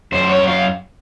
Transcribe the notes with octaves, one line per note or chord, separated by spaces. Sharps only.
F#2 C5
C#5
F#2
F5